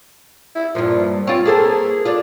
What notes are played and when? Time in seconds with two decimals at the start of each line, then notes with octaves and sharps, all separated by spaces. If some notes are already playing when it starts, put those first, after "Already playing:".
0.55 E4
0.75 G2 A#2 F3
1.27 C4 F4 C#5
1.45 A#3 G#4 A4 C5
2.05 D4 F4